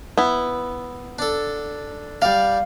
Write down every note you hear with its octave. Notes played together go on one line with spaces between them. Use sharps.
B3 E4
D4 A4
G3 D5 F5